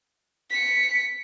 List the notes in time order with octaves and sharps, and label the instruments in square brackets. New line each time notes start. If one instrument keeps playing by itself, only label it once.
[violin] B6 C#7